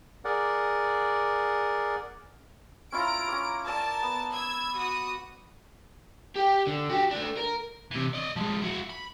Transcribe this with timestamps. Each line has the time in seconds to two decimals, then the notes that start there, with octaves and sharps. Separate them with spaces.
0.25 G#4 A#4 D5 F#5
2.92 C#4 E4 F4 A#5 D7
3.28 C#4 D6
3.66 A#4 D5 A5 E6
4.02 B3
4.34 E6 G#6
4.77 F#4 D#6
6.35 G4 G5
6.67 D3
6.90 F#4 G4
7.11 A3 D4
7.37 A#4
7.91 C3 E3
8.13 D5 D#5
8.36 F3 G#3
8.61 E4 F#4
8.90 B5